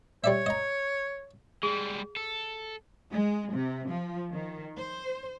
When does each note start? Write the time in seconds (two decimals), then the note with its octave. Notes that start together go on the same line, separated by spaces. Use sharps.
0.24 G3 C#5 D5 E5
0.46 D#5 A#5
1.63 G3 G#3 G#4
2.16 A4
3.12 G#3
3.53 C3
3.88 F3
4.31 D#3
4.76 C5